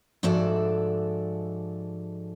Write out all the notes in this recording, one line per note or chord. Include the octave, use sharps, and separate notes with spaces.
G#2 F3 F#4 A4 D5 E5